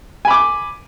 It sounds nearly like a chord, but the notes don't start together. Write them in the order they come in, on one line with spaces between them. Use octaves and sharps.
G#5 B5 D6